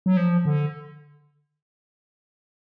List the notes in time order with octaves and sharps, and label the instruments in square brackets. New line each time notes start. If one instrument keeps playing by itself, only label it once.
[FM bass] F#3
F3
D3